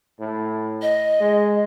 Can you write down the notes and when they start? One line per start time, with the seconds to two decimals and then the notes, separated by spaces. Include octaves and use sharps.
0.19 A2
0.82 D#5
1.20 G#3